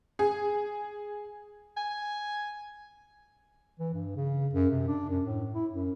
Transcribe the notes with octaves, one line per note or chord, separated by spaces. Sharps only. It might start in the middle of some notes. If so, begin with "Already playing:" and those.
G#4
G#5
E3
G2
C#3
F#2
C3
D4
F#2
A2
E4
F#2